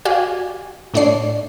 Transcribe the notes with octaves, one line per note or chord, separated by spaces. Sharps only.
F#4 G4 D5 F5 G#5
A2 A3 D4 C#5 D5 C7